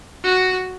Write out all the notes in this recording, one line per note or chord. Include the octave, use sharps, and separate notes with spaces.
F#4